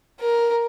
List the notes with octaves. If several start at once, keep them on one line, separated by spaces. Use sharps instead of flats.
A#4